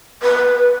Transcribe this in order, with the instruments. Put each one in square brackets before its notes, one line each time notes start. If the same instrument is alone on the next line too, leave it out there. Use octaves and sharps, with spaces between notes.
[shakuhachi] B4